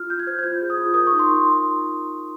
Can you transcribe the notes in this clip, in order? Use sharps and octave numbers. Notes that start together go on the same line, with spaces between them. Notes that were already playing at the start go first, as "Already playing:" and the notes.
Already playing: F4 F6
F4 G6
G#6
C5 G6
G#6
F4 G6
G#4
D#6
F4
A#4 D#6
C#6
D#4
C6